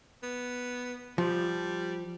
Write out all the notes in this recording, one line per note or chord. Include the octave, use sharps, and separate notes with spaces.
B3
F3 G3